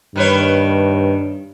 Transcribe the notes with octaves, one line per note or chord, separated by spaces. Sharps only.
G2 D#3 B4 C#5